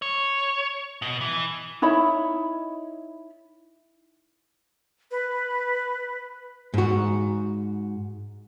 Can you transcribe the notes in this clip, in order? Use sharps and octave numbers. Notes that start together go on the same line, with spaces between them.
C#5
B2
E3
D#4 E4 C#5 B5
B4
G#2 F#4